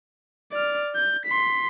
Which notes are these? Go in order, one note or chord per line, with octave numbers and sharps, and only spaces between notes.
D5 F6
G6
C6 B6